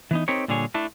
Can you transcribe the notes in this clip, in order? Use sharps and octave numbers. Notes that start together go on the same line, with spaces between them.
E3 B3 D#4
C4 D#4 G4 A#4 C#5
A#2 D3 G3 G#4 C#5 G#5
A3 D4 E4